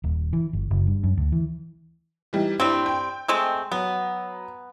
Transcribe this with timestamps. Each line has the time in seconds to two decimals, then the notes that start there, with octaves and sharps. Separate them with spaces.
0.04 D#1
0.33 E3
0.53 G1
0.71 F#1
0.87 G2
1.04 F#2
1.17 D2
1.32 E3
2.33 E3 G3 D#4
2.60 G2 G3 C4 E4
2.86 G5
3.28 G#3 A3 C4
3.72 F#3 B3